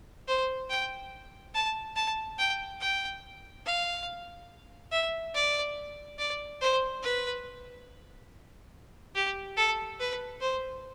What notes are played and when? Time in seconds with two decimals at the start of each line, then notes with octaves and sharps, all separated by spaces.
0.28 C5
0.70 G5
1.54 A5
1.96 A5
2.38 G5
2.81 G5
3.66 F5
4.92 E5
5.34 D5
6.18 D5
6.61 C5
7.03 B4
9.15 G4
9.57 A4
10.00 B4
10.41 C5